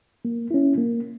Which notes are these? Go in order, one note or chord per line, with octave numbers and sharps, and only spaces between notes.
A#3
C#4 E4
A#3